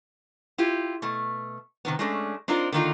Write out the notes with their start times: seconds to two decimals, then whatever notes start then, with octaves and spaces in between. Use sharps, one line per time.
0.58 E4 F4 G4
1.02 B2 A3
1.85 C3 D#3 B3
1.99 G#3 A3 C#4 D4
2.48 C4 D4 D#4 F4 A#4
2.72 D3 D#3 A#3 D#4 F4